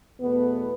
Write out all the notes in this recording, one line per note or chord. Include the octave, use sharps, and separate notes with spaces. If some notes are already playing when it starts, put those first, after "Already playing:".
E2 B2 A3 B3